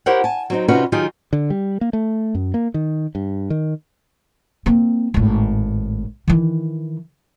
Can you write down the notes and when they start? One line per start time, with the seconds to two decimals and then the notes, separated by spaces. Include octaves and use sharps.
0.06 E4 G4 A#4 C5 C#5 F#5
0.24 G#5 A5
0.50 F#3 C4 D#4
0.68 C3 C#4 D#4 F4 F#4 B4
0.92 D#3 F#3 D#4 F4 G4 G#4
1.33 D3
1.50 G3
1.81 A#3
1.93 A3
2.35 F#2
2.54 A#3
2.74 D#3
3.15 G2
3.50 D#3
4.66 A#3 C4
5.14 G#1 A2
6.28 D#3 E3